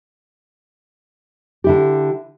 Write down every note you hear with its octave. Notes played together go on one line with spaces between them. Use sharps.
D3 E4 G4